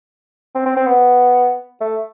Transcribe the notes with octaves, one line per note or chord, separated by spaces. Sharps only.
C4
C4
C4
B3
A3